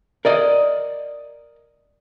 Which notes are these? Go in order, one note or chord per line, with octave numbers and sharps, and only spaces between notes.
A#4 D5 D#5